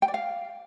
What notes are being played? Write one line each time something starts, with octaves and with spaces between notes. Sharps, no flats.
G5
D5
F5